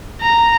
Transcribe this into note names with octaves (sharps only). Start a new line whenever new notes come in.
A#5